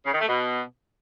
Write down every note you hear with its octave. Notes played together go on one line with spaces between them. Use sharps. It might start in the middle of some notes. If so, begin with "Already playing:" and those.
C#3
D#3
A3
B2